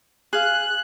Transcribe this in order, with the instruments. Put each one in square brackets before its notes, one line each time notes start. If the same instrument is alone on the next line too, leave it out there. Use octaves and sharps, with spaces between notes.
[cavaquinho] G#4 F5 [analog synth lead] F#6